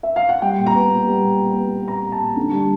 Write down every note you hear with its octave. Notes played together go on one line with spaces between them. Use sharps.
E5
F5
F#5
G3 G5
A#2
A#5
B3
A#2
G3
A#2
A#2
B3
B3
A#2 A#5
A#2
A5
A#2
D3
G3